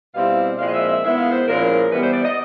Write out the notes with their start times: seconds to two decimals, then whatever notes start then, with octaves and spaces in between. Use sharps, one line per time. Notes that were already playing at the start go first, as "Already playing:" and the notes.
0.15 B2 G3 C4 E4 F5
0.59 A#2 F3 G#3 C4 E4 F5
0.68 D#5
0.74 E5
0.88 E5
1.03 D#3 G#3 B3 E4 E5
1.18 F5
1.32 C5
1.48 A#2 F3 G#3 C#4 E4 A#4
1.91 E3 G3 B3 B4
2.02 C5
2.13 D5
2.24 D#5